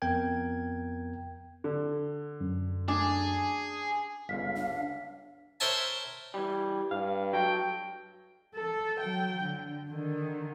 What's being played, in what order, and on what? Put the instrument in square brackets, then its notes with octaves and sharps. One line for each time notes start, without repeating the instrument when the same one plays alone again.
[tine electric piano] F2 B3 A#4 G5 G#6
[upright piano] D3
[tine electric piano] F#2
[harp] D4 [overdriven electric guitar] G#4
[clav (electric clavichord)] G1 C#2 [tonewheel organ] F5 [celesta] B6
[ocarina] D4
[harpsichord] A#4 C5 C#5 E5 G#5 A5
[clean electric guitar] E3 G3
[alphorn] G2 [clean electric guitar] F5
[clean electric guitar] F#3 A4 [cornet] G5
[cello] A4
F#3 G5
D3
D3 D#3